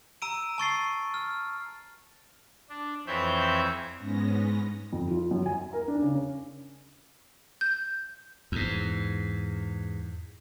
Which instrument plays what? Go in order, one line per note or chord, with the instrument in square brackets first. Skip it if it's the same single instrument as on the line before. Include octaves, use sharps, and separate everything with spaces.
[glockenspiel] A#5 E6 D7 D#7
A5 C#6 A6 C7
F6
[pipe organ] D4
F2 E3 C4 C#5 E5 G6
[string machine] G#2 G#3 B3 C#4 A#6
[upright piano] F2
F4
F#2
G#5
A#4
D4
C#3
C#4
[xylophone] G6
[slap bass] E2 G#2